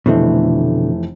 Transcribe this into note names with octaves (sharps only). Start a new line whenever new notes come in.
F1 B2 D3 E3 A3 C4